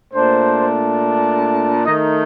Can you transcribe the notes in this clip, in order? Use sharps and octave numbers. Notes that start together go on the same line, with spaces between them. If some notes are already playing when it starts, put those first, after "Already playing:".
A#2 A3 D4 C5
D#3 A3 D#4 D#5